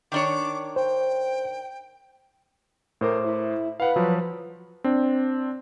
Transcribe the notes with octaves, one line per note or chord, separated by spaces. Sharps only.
D#3 D4 C#5 D6
C5 G5
A2 A#4 C5 D6
E4
B4 F5 F#5
F3 F#3
C4 D4